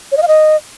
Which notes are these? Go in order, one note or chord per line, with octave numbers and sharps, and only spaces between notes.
C#5
D#5
F5
D#5